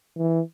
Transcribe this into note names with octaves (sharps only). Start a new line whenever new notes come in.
E3